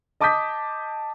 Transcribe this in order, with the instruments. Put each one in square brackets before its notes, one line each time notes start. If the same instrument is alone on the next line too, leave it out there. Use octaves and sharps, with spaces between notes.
[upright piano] D#5 A5 D6 D#6 G6 B6